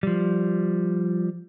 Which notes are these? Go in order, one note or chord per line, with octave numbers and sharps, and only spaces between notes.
F3 G3